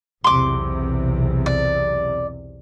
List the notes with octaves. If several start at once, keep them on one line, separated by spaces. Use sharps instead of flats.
B1 E2 C3 C6 D6
D5